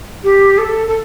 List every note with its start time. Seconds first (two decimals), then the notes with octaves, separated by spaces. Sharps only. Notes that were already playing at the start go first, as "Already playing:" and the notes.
0.24 G4
0.58 A4
0.87 A4